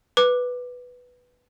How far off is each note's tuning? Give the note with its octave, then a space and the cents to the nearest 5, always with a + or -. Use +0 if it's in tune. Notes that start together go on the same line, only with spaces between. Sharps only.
B4 +0 D6 +10